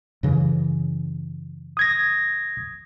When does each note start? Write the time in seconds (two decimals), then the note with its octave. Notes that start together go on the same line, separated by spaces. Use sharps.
0.23 F#2 C#3 E3
1.77 D#6 G#6 A#6